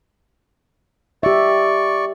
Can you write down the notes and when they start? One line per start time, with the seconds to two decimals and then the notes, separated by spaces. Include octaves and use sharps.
1.23 G4 D5 E5 C#6